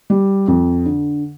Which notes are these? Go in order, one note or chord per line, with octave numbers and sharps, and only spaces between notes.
G3
F2
D3